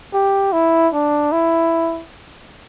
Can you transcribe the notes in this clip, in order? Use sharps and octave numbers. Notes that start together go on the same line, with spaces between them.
G4
E4
D4
E4